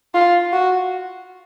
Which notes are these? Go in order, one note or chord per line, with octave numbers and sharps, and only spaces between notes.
F4
F#4